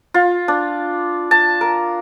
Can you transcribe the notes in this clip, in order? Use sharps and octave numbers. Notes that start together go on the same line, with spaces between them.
F4
D4
A5
A#4